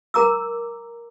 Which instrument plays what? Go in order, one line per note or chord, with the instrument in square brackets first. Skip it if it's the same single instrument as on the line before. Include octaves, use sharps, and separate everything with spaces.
[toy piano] A#4 A#5 D6 E6